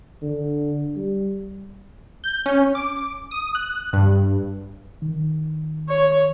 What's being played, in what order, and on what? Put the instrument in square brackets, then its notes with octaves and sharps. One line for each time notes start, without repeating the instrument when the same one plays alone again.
[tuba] D3
G3
[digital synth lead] G6
C#4
D6
D#6
F#6
G2
[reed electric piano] D#3
[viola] C#5